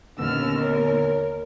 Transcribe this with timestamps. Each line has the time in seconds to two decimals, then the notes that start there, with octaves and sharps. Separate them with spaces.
0.19 D#2 A#2 D3 B3 C#4 E6 F6
0.58 A#4 C#5